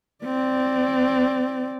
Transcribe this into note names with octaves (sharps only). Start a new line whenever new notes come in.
C4 D5